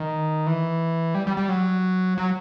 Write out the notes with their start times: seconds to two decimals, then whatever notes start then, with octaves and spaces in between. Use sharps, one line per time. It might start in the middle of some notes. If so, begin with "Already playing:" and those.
Already playing: D#3
0.47 E3
1.15 G3
1.27 G3
1.37 G3
1.49 F#3
2.18 F#3